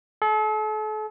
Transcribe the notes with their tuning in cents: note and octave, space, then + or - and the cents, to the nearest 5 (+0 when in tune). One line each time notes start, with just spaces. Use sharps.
A4 -40